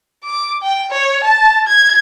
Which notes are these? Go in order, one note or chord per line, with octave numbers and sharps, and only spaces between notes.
D6
G5
C#5
A5
G#6